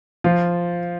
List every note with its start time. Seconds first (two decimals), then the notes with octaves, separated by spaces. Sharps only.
0.24 F3 F4